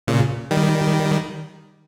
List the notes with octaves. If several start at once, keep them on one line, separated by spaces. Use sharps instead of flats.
A#2 C#3
D#3 G3